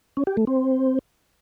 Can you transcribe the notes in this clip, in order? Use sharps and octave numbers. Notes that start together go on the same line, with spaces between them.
C#4
G4
A3
C4